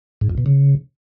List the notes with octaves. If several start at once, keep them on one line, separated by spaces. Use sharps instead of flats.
G#2
F2
B2
C#3